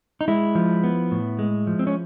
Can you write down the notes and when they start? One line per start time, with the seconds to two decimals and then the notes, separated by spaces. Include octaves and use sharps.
0.21 D#4
0.28 G#3 E4
0.55 F3
0.83 B3
1.11 A2
1.39 G#3
1.67 F3
1.79 C4
1.87 C#4